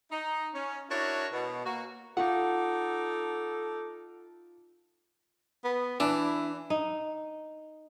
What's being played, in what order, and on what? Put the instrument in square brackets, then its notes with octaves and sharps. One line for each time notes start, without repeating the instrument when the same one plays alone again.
[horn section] D#4
C#4
D4 E4 F#4 A#4 C#5
B2
A#3 F#4
[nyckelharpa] D#4 D6 [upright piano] F4 [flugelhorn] A4 [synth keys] F#5
[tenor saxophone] B3
[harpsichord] E3 [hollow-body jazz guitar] D4 [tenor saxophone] E4
[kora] D#4